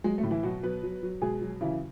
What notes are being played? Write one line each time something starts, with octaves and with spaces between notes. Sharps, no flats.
F#3 G#3
A3
A2
E3 E4
B2 F#3 F#4
F#3 B3 B4
F#3
F#3
B2 G#3 G#4
F#3
C#3 E3 E4